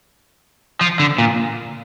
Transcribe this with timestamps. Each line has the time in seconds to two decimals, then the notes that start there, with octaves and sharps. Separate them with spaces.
0.81 F3
0.99 D3
1.18 A#2